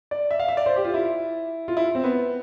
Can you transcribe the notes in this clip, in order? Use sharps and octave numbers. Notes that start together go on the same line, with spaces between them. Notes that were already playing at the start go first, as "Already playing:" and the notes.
D5
E5
F5
E5
D5
C5
G4
F4
E4
F4
E4
C4
B3